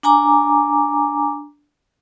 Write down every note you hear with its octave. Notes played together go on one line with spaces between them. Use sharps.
D4 G#5 A#5 D6